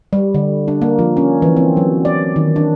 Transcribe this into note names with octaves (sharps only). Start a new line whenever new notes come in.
G3
D3
D4
A#3
F3
C#4
E3
C4
F#3
D5
D#3
D4